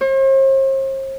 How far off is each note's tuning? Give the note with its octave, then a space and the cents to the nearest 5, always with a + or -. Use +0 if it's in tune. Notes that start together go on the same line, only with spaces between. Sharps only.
C5 +45